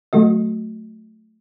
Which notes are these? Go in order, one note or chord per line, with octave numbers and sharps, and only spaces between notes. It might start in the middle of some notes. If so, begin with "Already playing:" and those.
F#3 A3 F#4 D#5